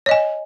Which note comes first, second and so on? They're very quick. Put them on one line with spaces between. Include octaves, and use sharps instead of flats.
C#5 D#5 G#5